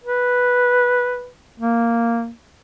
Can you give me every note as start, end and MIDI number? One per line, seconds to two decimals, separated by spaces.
0.04 1.29 71
1.60 2.30 58